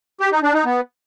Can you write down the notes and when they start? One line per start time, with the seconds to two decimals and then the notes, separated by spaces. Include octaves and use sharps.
0.21 G4
0.32 D#4
0.43 D4
0.54 D#4
0.65 B3